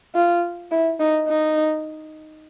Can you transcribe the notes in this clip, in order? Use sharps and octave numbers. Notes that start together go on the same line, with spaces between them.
F4
E4
D#4
D#4